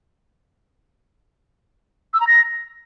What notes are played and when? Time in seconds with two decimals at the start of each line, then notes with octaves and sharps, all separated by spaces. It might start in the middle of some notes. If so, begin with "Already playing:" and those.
2.14 E6
2.20 A#5
2.27 A#6